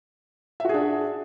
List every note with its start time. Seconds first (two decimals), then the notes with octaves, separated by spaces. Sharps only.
0.60 E5
0.65 F#4
0.69 G#4
0.74 D4